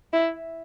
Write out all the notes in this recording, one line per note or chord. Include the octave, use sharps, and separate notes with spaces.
E4